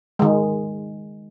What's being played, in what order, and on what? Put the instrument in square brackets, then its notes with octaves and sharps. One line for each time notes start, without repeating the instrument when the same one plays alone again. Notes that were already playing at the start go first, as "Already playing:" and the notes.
[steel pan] D#3 G#3